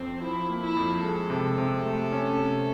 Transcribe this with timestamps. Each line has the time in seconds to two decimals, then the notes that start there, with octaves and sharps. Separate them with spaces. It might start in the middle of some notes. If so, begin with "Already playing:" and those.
Already playing: F2 C4
0.21 F3 E4
0.49 A#3
0.62 E4
0.77 F2
1.03 G#3 A4
1.30 C3
1.58 C3
1.85 A3
2.12 C#4
2.39 C3